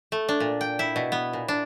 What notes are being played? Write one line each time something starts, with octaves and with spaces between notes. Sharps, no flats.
A3
D4
A#2
G5
E4
B2
B3
A#2
D4